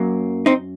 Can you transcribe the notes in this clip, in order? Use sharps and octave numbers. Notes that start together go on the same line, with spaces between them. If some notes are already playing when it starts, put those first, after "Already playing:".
Already playing: F#2 F#3 A#3
C4 D#4